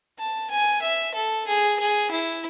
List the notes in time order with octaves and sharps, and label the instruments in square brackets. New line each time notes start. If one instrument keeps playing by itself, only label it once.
[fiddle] A5
G#5
E5
A4
G#4
G#4
E4